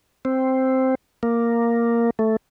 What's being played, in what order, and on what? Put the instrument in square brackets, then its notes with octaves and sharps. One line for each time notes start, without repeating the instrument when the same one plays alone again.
[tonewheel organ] C4
A#3
A3